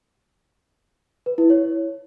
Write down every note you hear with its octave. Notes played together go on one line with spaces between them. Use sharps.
B4
E4
C#5